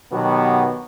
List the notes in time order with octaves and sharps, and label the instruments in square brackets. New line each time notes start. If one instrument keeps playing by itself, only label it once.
[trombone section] B2 D#3 F#3 B3 F#4 G4